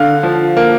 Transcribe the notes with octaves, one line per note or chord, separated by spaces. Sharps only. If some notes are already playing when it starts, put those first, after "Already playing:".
Already playing: D3 F5
F3
A#3